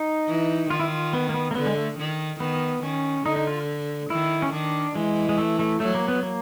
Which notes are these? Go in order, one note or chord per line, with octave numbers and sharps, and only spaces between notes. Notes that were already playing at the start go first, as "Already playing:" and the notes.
Already playing: D#4
E3
D#3 F4
E4
F4
B3
A#3
B3
A#3
D3 B3
G#3
A3
D#3
D#3 B3
D#3 C#4
D3 D#4
D#4
F4
D#3 E4
C#4
D#3 D4
E3 G#3
G#3
A3
A3
F#3 A3
A#3
B3
A#3